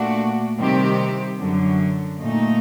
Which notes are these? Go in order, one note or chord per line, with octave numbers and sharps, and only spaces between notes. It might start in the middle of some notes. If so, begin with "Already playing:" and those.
Already playing: A#2 A3 D4 F#4
C3 D#3 G3 C4 G4
F#2 D3 F#3
A#2 A3 D#4